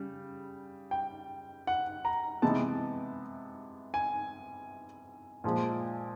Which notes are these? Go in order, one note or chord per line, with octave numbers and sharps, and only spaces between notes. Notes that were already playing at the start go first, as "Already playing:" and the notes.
Already playing: C#3 G3
G5
F#5
A#5
C3 E3 G#3 B3 D#4 A5
G#5
A#2 F3 G#3